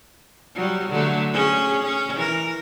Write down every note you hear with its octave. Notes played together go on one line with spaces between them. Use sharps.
F#3 G3
D3 F#3 A3
C#4 G#4
C#4
E3 A#4